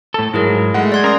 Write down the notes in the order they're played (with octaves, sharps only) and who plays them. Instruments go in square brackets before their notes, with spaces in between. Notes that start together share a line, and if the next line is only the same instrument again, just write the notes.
[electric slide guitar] A2 A4
[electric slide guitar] G#2 F#3 [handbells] E4 G#4 A#4
[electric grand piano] G#3 F#5 [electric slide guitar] A3
[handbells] D5 C6 G#6
[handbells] C#4 D#6 [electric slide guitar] A#4